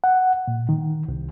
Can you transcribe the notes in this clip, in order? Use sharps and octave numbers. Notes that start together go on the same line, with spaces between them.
F#5
A#2
D#3
C2